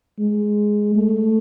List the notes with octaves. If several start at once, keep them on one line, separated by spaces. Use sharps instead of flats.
G#3
A3